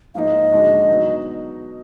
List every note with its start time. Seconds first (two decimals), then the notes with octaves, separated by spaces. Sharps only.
0.14 G#2 F3 A#3 D#4 D#5 F5
0.52 D3 G#3 D4 F#4
0.88 B2 F#3 B3 D#4